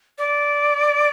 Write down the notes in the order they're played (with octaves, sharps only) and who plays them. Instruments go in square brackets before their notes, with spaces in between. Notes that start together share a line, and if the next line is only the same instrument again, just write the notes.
[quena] D5